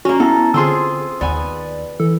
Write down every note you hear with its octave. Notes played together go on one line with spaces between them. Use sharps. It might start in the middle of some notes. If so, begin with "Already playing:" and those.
A#3 C#4 F#4
B3 E4 A4 A#5
D3 C4 F4 G#4 C6 E6
D#2 B3 D5 G#5
E3 A4